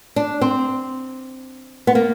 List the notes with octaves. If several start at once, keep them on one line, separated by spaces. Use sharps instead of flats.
D4
C4
B3
A#3